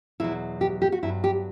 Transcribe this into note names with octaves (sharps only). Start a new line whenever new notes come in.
E2 B2 F#3 E4
G4
G4
F#4
G2 F#3 E4
G4